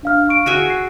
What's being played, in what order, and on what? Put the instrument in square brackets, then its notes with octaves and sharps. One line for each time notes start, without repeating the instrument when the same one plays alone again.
[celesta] D4 F5 F6
C#6 D7
[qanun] F#4 G#4 E5
[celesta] C7